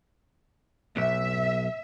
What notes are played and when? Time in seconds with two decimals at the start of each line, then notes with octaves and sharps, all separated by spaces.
0.97 B1 E5